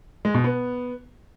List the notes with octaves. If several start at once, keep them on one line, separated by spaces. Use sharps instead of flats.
G#3
B2
B3